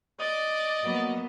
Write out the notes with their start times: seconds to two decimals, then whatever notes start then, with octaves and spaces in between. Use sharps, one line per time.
0.20 D5 D#5
0.84 F#3 A#3 B3